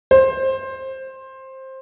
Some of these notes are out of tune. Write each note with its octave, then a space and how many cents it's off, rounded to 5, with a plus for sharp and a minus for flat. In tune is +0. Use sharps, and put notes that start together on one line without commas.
C5 +15